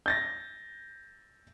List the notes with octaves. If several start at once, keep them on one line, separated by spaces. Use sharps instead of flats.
G6 A6 A#6